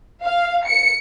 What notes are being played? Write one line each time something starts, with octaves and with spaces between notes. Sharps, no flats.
F5
C#7